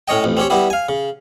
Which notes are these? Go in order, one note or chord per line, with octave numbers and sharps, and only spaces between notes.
A2 C#4 C#5 D#5 G5
A1 F2
C4 C#4 G4 C#5
G3 B3 E4 G4
F5 G#5
C#3